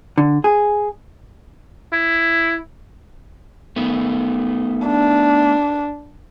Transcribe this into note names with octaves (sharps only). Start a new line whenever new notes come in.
D3
G#4
E4
A3 B3 D#4
D4